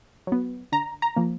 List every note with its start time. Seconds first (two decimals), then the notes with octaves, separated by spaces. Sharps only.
0.27 F#3 B3
0.72 D3 A#5
1.02 A#5
1.16 F3 A#3